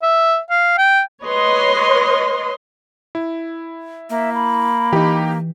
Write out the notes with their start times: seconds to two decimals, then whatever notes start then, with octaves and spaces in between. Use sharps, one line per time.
0.02 E5
0.50 F5
0.78 G5
1.23 B4 C#5 D#5 C6
3.15 E4
4.10 A#3 E5
4.35 B5
4.93 E3 D#4 G4